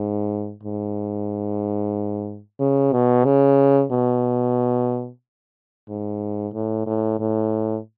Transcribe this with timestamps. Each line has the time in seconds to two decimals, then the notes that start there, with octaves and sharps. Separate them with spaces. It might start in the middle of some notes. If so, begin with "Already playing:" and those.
Already playing: G#2
0.63 G#2
2.60 C#3
2.92 B2
3.25 C#3
3.92 B2
5.89 G#2
6.53 A2
6.86 A2
7.19 A2